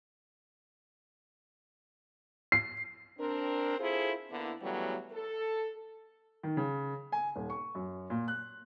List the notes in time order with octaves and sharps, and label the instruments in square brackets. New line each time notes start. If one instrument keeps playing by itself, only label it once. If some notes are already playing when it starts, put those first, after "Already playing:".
[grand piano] C7
[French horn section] C4 D4 A#4
E4 F4 G#4 A4 C5
D3 A#3 B3 E4
C#3 E3 F#3 G3 A3 B3
A4
[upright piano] D#3
C#3
G#5
D#1
C#6
F#2
A#2
F#6